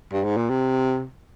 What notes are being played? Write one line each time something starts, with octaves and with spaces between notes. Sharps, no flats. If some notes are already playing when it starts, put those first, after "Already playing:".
G2
G#2
A#2
C3